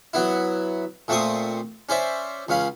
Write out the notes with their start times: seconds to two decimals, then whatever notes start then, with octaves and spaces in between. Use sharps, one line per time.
0.13 F#3 B3 E4
1.08 A#2 A3 C4 C#6 D#6
1.89 C#4 C5 D5 E5
2.48 C#2 C#4 F5 B5